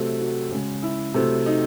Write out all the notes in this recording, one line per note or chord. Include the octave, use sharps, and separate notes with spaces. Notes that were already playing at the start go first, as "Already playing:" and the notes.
Already playing: C3 F#3 A3
F#4
C#3 G#3
E4
C3 F#3 A3
D#4